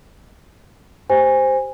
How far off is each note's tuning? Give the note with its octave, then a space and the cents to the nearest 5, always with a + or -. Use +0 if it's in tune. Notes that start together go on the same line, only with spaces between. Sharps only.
G4 +0 C5 +0 G#5 -20